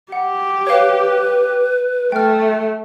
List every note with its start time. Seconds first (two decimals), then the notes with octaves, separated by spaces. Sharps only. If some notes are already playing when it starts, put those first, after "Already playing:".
0.12 G4 F#5
0.67 B4 C#5 F5
2.12 A3 G5 F6